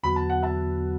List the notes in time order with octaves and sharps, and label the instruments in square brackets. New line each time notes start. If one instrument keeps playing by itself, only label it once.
[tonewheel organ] E2 D3 F#3 B3 F#4 [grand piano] B5
[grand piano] A5
F#5
E5 A5